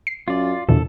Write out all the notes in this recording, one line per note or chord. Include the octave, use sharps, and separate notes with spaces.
C7
F#2 F4 D5
A#1 E2 B2 D3 E3 A4